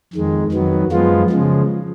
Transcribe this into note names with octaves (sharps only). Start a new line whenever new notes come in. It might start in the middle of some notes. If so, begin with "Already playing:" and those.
F2 D#3 G#3
F2 D#3 F#3 B3
F#2 F3 G#3 B3 F4
C#3 F3 G#3